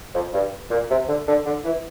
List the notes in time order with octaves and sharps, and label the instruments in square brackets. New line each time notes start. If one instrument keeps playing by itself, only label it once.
[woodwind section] F2
G2
A#2
C3
D3
D3
D3
E3